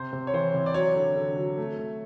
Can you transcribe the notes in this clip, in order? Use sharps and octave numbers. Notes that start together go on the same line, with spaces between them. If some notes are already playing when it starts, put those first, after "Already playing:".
Already playing: C3 C5
C3
C#5
E3 C5
C3
D5
F#3 C#5
D3
D3
F#3
A3
A3